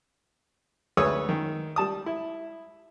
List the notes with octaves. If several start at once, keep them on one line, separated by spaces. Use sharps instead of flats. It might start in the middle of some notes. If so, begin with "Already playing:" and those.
D2 G#4 B4 C#5 D#6 E6
D#3
G3 A5 D#6
E4